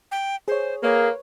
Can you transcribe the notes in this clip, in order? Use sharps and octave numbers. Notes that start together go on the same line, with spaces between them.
G5
G#4 C5 C#5
A#3 G#4 B4 C#5